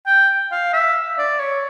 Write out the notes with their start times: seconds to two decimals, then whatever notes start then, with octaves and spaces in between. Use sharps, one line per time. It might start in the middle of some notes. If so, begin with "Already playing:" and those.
0.06 G5
0.52 F5
0.73 E5
1.18 D5
1.39 C#5